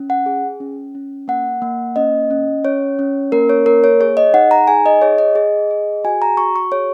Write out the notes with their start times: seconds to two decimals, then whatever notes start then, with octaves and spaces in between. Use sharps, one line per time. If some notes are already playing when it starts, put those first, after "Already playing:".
Already playing: C#4
0.10 F#5
0.26 G#4
0.60 C#4
0.95 C#4
1.28 A#3 F#5
1.62 A#3
1.96 C#4 D#5
2.30 C#4
2.64 C#4 C#5
2.99 C#4
3.32 A#3 A#4
3.49 C#5
3.66 A#3 A#4
3.84 C#5
4.00 G#4 C#5
4.17 D#5
4.34 D#4 F#5
4.51 A#5
4.67 G#4 G#5
4.86 D#5
5.01 G#4 C#5
5.18 D#5
5.35 G#4
5.71 G#4
6.05 F#4 G#5
6.22 A#5
6.37 F#4 C#6
6.56 C#6
6.72 G#4 C#5